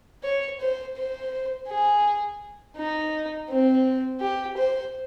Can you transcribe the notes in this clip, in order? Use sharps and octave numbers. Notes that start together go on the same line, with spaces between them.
C#5
C5
C5
G#4
D#4
C4
G4
C5